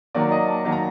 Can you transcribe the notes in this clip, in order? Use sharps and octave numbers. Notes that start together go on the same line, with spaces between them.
D#3 F#3 A#3 D5
D#5
A5
D#3 F#3 A#3 A5
A#5